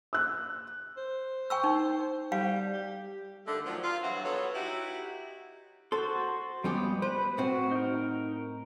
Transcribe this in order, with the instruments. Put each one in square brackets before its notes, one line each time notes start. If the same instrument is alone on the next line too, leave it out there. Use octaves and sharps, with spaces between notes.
[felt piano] E6 F#6
[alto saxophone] C5
[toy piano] G5 C#6 E6
D#4
[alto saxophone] G3 [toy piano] F5
[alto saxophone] G4
[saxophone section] D#2 D3 A3
D#3 F3 F#3
F4
G2 E3 F#3 F#4
F#3 B3 A4 C#5
D#4 E4 F#4 G4
[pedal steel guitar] F#4 C5 C6 [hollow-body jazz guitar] A4
[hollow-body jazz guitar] F2 C#4 G4 [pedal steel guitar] G3 G#3 B3
[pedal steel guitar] B4 [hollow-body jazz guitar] C5
[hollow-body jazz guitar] A2 C4 [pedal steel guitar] F#4
[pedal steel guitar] D#4 A#4